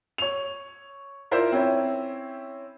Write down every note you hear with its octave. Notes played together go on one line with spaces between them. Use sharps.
C#5 F7
E4 F4 A#4 C5 D5 E5
C4 C#4 E4